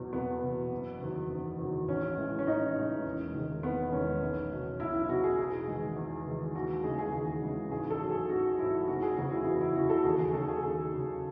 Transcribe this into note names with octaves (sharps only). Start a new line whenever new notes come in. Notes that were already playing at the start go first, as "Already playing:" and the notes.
Already playing: E2 B2 F#3
E2 B3
B2 F#3
F#1
E2 D#3 F#3
F#1
E2 D#3 F#3
A1 C#4
A2 E3 G#3
C#4
A1 D#4
A2 E3 G#3
E1
E2 D#3 G#3
E1 B3
E2 D#3 G#3 C#4
B1
B2 F#3
B1 E4
E4
B2 F#3 F#4
G#4
E2 G#4
D#3 G#3
E2
D#3 G#3
D#2 F#4
C#3 E3 G#3 G#4
G#4
D#2 G#4
C#3 E3 G#3
A1 G#4
A4
G#2 F#3
G#4
A1 F#4
G#2 F#3 E4
F#1 F#4
G#4
E2 C#3 E3 F#4
E4
F#1 F#4
E4
E2 C#3 E3 F#4
A4
F#4
D#2 G#4
G#4
C#3 F#3 A4
G#4
D#2 G#4
C#3 F#3